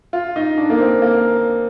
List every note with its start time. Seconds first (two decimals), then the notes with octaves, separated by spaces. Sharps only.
0.13 F4
0.36 D#4
0.58 D4
0.70 A#3
0.79 C4
1.02 A#3